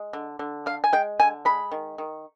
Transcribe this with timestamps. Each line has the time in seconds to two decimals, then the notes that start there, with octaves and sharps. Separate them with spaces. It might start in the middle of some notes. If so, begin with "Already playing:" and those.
Already playing: G#3
0.13 D3
0.39 D3
0.66 D4 F5
0.84 G#5
0.93 G#3 G5
1.20 D3 G#5
1.45 G#3 B5
1.72 D#3
1.98 D#3